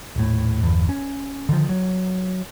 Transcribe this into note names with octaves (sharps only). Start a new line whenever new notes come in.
D#1 A2
G1 E2
C#4
D3 D#3 F3
F#3